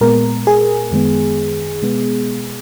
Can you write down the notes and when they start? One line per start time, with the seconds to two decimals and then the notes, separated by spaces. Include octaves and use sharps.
0.01 A#2 G#3 B3 A#4
0.47 G#4
0.91 F#2 D#3 G#3 B3
1.82 B2 G#3 B3